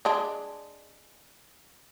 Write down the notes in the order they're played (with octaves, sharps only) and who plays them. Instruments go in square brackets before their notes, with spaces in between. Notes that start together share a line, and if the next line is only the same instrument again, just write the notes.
[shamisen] G#3 D4